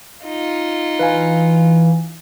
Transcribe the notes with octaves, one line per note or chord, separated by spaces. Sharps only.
D#4 F4
E3 B4 F5 G#5